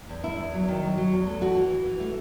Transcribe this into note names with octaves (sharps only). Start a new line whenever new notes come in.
E2
E2 E4
E2
F#3
D#3
F#3
F#3
E2
A3
E3 F#4
E3
E3
E3
A3